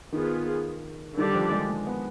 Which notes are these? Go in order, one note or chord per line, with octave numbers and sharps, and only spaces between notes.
D#3 B3 F4 G#4
D3 D#3 G3 D4 G4 D5
F3
G#3
G#3
B3